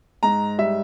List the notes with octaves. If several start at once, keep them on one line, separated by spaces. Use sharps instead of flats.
G#2 A#5
G3 E5